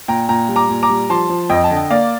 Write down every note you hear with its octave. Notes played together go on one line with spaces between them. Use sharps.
A#2 G5 A#5
A#2 G5 A#5
G3
A#5 D6
A#2
A#5 D6
G3
F3 A5 C6
F3
F2 D#5 G5
A5
D3
G5
A#3 D5 F5